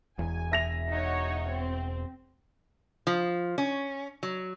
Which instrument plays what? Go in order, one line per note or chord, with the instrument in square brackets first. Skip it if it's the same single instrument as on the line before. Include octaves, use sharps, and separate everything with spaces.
[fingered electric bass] E1 E2 [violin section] G#5
[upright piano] E5 A#6 F7
[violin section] D#4 F#4 C#5
C4
[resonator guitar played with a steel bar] F3
C#4
F#3